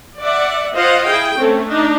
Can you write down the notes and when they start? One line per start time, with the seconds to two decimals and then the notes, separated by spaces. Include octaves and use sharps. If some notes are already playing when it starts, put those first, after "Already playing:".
0.21 D5 E5 F#5
0.76 F4 C5 D#5 F5 F#5
1.08 E4 G#4 G5
1.37 A3 C4 C#4
1.69 D4 D#4